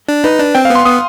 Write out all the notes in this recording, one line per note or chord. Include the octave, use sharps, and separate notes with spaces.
D4
D#4 B4
D4
C4 G5
F5
B3
C6
B3 D#6